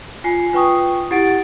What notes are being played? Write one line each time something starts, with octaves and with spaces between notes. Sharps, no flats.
F4 G#5 C7
F4 B4 G5 C#6 D#6
E4 G4 F#5 A6 D7